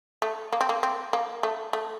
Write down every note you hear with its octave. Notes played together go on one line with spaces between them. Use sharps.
A3
A#3
C4
A#3
C4
A#3
A3
A3